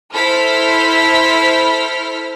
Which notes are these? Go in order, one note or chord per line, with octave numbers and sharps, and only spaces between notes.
E4 A4 C5 F6 B6